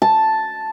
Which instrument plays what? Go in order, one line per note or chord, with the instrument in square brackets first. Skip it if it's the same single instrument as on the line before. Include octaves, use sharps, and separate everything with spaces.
[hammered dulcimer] A5